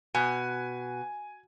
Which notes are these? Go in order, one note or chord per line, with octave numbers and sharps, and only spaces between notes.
B2 G#5